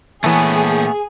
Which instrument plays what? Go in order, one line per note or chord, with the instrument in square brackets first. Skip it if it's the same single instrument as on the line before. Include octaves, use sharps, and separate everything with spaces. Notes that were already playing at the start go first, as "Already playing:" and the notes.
[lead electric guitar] A#2 C#5 [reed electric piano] E3 G#5 [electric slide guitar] A3 B3 [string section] G#4